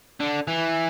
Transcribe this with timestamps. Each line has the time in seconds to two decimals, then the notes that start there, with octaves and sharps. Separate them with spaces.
0.20 D3
0.47 E3